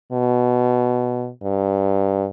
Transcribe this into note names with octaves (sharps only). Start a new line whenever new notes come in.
B2
G2